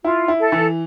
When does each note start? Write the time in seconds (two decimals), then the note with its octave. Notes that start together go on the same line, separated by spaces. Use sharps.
0.04 E4 F4
0.28 E4
0.40 A4
0.52 E3